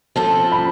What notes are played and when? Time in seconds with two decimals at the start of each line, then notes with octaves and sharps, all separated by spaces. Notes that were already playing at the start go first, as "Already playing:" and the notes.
0.16 F3 C4 F4 A4 A5
0.52 B5